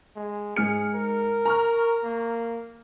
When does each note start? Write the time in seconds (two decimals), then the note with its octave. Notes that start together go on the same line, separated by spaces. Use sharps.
0.16 G#3
0.56 G#2 G#4 F6 C#7
0.95 A#4
1.45 A#5 C#6 F6
2.04 A#3